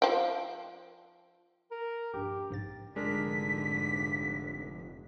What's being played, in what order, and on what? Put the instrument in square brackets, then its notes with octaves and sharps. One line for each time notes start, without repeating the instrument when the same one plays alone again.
[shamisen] F3 G5
[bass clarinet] A#4
[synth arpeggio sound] A#1 G2 [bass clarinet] G4
[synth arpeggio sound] A#1 G#2 A6
[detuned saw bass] F1 [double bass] G#2 D3 [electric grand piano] G#3 D4 A#4 [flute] B6